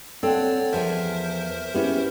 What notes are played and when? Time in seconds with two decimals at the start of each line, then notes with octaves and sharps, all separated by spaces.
0.23 C4 A4 C#5 D5 F#5
0.73 E2 F3 A#4 C5 E5 G#5
1.74 B3 C#4 E4 G4 G#4